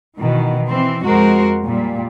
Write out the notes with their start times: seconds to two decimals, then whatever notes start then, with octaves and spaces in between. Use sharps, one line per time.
0.17 B2 D#3 E3
0.68 E3 C4
1.03 F2 G#3 F#4 A#4 C5
1.65 A#2 G3